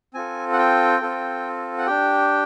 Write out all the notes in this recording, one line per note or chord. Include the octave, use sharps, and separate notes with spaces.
C4 F4 A4 G#5
F#5
G5
C4 F4 A4
F#5
D4 G4 G5